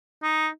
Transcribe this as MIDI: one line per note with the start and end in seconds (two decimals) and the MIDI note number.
0.23 0.48 63